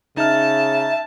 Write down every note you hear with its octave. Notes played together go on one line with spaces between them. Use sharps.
C#3 D#4 E5 A5 F6